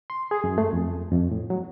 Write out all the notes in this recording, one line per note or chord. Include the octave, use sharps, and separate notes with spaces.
C6
G#4
F#2
A3
F2
F2
A2
F#3